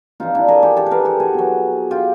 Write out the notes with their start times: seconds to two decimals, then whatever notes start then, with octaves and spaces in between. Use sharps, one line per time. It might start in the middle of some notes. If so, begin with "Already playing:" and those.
0.20 C3 F3 D#4 F4
0.35 D4 E4
0.48 G#4 A#4
0.63 G4 A4
0.77 G4 A4
0.86 B4
0.91 G#4 A#4
1.05 G4 A4
1.20 F#4 G#4
1.34 B2 F#3
1.91 F4 G4